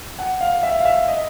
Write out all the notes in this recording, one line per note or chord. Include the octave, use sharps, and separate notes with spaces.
F#5
F5
E5
F5
E5
D#5